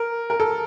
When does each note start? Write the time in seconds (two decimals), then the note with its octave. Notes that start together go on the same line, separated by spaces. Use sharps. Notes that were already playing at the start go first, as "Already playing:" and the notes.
Already playing: A#4
0.30 A#4
0.40 A4